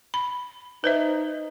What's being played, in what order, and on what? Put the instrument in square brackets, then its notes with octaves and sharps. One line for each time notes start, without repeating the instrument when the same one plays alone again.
[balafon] B5
[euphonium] D#4 [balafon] B4 C5 E5